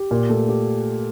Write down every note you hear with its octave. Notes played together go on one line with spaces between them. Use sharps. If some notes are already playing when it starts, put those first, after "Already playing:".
Already playing: G4
A#2
A3
G4